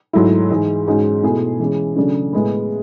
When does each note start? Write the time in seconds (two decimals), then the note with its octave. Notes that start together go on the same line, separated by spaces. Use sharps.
0.13 G#2 F#3 A3 E4
0.50 G#2 E3 G#3
0.87 G#2 G#3 C#4 F#4
1.24 B2 A3 E4 G#4
1.60 E3 G#3 C#4 G#4
1.96 C#3 F#3 A3 D4 G#4
2.33 A2 G#3 B3